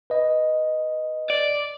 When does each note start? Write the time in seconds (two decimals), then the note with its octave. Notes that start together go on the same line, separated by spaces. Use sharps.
0.10 B4 D#5
1.30 D5